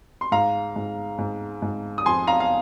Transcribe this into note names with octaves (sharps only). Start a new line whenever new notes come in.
C6
G#2 F5 A#5
G#2
G#2
G#2
D#6
F2 G#5 C6
F5 A#5
F5